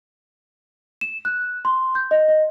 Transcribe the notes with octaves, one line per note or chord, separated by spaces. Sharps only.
E7
F#6
C6
G6
D#5
D#5